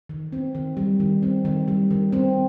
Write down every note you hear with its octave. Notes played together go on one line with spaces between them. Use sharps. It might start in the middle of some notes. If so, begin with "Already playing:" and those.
D#3
C4
D#3
G3
D#3
C4
D#3
G3
D#3
C4